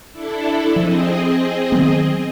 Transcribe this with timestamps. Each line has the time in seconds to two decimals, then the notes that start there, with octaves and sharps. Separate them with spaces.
0.12 D4 E4 A4
0.76 F3 C4 G#4 D#5
1.72 D#3 F#3 B3